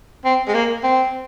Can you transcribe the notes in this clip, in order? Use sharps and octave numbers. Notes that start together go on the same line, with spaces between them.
C4
G#3
A#3
C4